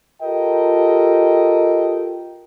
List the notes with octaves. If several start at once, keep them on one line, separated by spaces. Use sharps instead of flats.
F4 G4 A4 A#4 D#5 G5